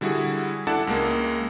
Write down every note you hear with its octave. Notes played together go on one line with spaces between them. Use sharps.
D3 G3 E4 F#4 G#4
D4 E4 A4 D5 F#5 A5
C#2 G#3 A#3